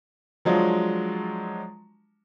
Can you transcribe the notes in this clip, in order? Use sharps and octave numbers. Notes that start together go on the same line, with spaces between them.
F3 F#3 G#3 D4 F4